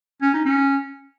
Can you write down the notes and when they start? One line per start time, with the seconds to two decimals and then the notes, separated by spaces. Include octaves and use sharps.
0.22 C#4
0.34 D#4
0.45 C#4